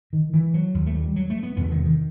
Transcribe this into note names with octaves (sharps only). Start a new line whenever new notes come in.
D#3
E3
F#3
D#2
A3
G3
F#3
A3
B3
E2 C3 B3
D#3
D#3